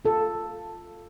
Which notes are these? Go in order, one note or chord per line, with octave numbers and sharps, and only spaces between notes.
F4 A4